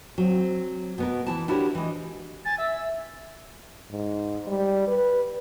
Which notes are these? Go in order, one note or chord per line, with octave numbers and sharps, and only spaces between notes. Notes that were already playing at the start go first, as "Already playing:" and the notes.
F#3 C4
B2 B3 A#4
E3 E4 A5
D4 E4 F#4 G4 A#4 C#5
E3 G#3
G#5 A6
E5 E6
G#2
G3
B4